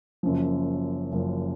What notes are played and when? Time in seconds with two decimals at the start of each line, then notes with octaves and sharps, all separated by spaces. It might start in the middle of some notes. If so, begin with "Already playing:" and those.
0.23 F#1 F#2 F3
1.12 F#1 F#2 F3